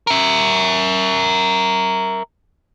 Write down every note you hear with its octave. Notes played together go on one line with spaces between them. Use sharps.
A#4 E5